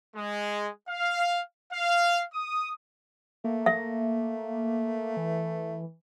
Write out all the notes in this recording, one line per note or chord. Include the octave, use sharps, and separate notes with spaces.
G#3
F5
F5
D#6
A3 A#3
E5
E3